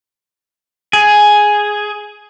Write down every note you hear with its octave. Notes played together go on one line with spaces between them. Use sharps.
G#4